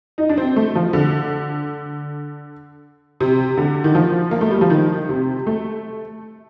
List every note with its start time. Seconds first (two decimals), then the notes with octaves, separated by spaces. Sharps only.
0.18 D#4
0.29 D4
0.38 C4
0.56 A3
0.75 F3
0.93 D3
3.20 C3
3.57 D3
3.84 D#3
3.95 F3
4.31 A#3
4.41 A3
4.51 G3
4.61 F3
4.70 D#3
5.09 C3
5.47 A3